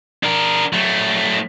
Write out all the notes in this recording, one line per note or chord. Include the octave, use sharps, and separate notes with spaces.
D4 A#4
F#3 A3